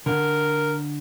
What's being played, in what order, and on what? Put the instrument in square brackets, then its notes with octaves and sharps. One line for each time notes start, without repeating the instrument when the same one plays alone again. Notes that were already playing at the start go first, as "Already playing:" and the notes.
[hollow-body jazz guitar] D3 [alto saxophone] A#4